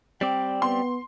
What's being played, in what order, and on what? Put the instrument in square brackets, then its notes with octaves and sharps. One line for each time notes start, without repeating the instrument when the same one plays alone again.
[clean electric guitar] G3 C4 D5 [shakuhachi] G5
[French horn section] B3 [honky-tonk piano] C6